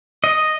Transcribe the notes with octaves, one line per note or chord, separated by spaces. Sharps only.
D#5